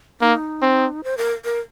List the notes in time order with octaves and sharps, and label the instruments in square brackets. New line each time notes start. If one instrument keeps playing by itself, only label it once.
[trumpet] A#3 [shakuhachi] D#4
[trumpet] C4
[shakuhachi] C5
A#4
A#4